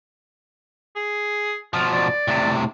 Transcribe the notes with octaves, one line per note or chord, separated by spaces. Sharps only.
G#4
B2 F3 F4
D5
A2 C3